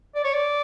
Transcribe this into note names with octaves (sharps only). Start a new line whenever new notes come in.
D5
C#5
D5